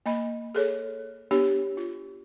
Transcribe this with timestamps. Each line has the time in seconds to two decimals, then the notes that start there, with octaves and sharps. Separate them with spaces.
0.06 A#3 D#5 B5
0.55 G#4 A4 C#5
1.31 B3 D4 G4 C#5
1.77 F4